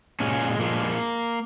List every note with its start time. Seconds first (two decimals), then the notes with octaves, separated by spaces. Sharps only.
0.20 A#2 G#3 C#4
0.59 A#2 F3 G#3 A#3